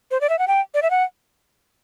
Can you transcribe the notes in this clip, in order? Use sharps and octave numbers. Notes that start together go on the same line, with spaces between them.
C5
D5
E5
F#5
G5
D5
E5
F#5